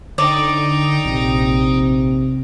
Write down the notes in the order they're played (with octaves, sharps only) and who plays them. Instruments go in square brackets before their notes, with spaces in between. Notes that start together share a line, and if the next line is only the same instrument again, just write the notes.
[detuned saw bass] D3 [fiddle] D#4 G5 [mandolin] D5
[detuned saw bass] A#1 [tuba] C3